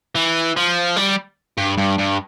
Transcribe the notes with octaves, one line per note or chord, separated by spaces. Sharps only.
E3
F3
G3
G2
G2
G2